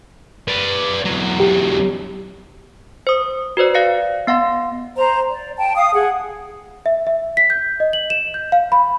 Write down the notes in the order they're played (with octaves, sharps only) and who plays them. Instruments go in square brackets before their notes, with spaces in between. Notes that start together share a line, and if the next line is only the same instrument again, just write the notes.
[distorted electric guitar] B4 D5
E2 F#3
[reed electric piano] G4
[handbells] C5 D#6
F#4 B4 C5 D5
D5 F5 A#6 C#7
B3 F5 F#5 C6
[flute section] C5 A#5
D5
G5 A5
F5 D#6
G#4 F#5
[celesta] E5
E5
B6
G6
D#5
F#7
E7
G6
F5
B5